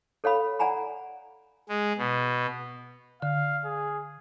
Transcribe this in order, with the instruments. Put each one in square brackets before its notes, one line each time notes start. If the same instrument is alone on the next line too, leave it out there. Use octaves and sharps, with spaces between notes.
[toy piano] A4 C#5 F5 B5
D5 F#5 G#5 A#5 B5
[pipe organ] G#3
B2
[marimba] D3 [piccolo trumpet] F5
[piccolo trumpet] G#4